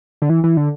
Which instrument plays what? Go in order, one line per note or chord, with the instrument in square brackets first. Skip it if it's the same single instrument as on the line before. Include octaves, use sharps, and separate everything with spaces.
[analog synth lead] D3
E3
E3
D3